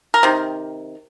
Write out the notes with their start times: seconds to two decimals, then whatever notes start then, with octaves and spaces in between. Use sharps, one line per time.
0.14 A#4
0.23 C3 D#3